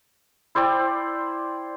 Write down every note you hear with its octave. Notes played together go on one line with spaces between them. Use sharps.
E4 C5 D5 G5